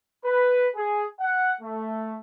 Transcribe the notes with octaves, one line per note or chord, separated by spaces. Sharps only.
B4
G#4
F#5
A3